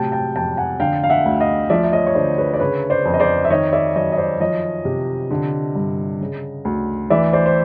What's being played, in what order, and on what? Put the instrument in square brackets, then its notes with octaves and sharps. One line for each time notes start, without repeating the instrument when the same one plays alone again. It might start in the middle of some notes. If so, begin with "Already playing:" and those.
Already playing: [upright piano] A2 C3 F#3 G5 A5
G5 A5
F2 G5 A5
F#5 G#5
D3 F5 G5
F5
E5 F#5
D2
D#5 F5
F3 D5 E5
E5
C#5 D#5
C#5
D3 C5 D5
B4 C#5
D5
C#3 B4 C#5
C5 D5
F2
D#5
C5 D5
E5
D#3 C#5 D#5
D5 E5
F#2 C#5 D#5
D#5
C5 D5
F3 C#5 D#5
C3
D3
G2
C#3
D2
E3 D5 E5
C5 D5
C5